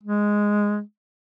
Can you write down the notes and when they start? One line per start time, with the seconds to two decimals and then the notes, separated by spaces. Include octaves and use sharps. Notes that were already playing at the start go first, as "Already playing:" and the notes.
0.03 G#3